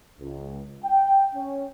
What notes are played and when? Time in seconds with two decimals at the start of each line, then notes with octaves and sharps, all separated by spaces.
0.20 C#2
0.84 G5
1.35 C#4